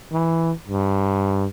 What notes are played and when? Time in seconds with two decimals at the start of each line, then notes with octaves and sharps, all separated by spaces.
0.12 E3
0.68 G2